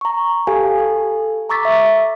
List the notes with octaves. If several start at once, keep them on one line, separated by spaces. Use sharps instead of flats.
A#5 C#6
G4 A4 F5 G#5
A4
A#5 C#6 D6 E6 A6 B6
E5